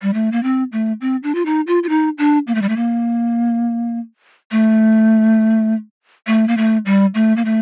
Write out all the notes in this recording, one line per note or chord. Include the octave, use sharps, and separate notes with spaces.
G3
A3
A#3
C4
A3
C4
D4
F4
D#4
F4
F4
D#4
D4
A#3
A3
G3
A3
A#3
A3
A3
A#3
A3
G3
A3
A#3
A3